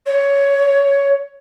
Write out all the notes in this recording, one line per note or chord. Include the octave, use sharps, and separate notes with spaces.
C#5